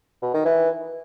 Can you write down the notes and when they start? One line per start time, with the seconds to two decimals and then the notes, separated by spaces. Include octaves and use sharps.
0.22 B2
0.34 D#3
0.45 E3